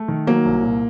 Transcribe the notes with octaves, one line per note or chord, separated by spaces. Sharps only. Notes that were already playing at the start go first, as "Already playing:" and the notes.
Already playing: A3
D#3
F#3 A#3
C2
A#2